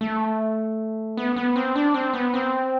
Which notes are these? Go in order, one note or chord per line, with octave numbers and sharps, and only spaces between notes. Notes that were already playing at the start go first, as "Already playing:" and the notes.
A3
B3
B3
C4
D4
C4
B3
C4